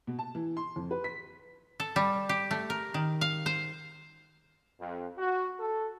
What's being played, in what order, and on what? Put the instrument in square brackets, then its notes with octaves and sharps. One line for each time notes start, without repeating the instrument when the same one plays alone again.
[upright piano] B2
A5
E3
C6
F2
B4
B6
[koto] A4
G3
G4
A3
A#4
D#3
F5
C5
[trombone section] F2
F#4
A4